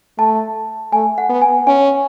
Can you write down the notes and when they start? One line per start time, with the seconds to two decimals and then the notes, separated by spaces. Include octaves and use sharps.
0.18 A3 A5
0.93 A3 G#5
1.18 F#5
1.29 B3
1.42 G#5
1.67 C#4 G#5